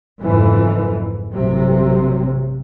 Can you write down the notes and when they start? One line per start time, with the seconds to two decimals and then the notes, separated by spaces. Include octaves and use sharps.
0.21 F#1 F2 G#2 E3
1.32 A1 G2 C3 F#3